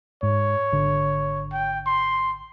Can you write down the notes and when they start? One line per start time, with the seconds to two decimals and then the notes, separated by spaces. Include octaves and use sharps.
0.23 G#2 C#5
0.72 G#1 D3
1.53 G5
1.87 C6